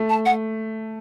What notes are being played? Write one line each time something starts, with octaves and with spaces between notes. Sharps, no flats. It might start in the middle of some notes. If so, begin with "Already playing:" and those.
Already playing: A3
A5
F#5